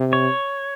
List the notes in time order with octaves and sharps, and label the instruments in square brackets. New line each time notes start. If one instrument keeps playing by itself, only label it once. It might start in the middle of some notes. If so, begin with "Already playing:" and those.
Already playing: [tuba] C3
[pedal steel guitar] C#5